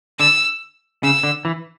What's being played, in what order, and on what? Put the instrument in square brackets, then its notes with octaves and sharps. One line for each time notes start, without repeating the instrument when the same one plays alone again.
[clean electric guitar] D3 [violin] E6
[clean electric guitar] C#3 [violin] E6
[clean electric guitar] D3
E3